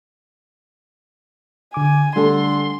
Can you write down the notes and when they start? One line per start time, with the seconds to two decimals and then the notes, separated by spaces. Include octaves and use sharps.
1.74 D3 G#5 D6
2.16 D3 G3 A3 A4 C6